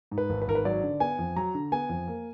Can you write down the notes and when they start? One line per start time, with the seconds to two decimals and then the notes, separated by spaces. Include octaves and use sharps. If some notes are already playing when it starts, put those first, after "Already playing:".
0.11 G#2
0.18 B4
0.30 G#1
0.42 B4
0.48 G#1 A#4
0.55 B4
0.65 F#3 D5
0.83 D3
1.00 B3 G#5
1.18 F2
1.36 F#3 A#5
1.55 D3
1.72 B3 G#5
1.89 F2
2.08 A#3